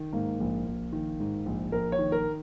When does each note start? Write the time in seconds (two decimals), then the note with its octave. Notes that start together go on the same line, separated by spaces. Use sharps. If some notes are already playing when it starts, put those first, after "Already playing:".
Already playing: D#3
0.13 G#2 A#3
0.40 A#1
0.66 A#1
0.93 D#3
1.20 G#2
1.46 A#1
1.72 A#1 A#4
1.92 C#5
1.99 D#3
2.12 A#4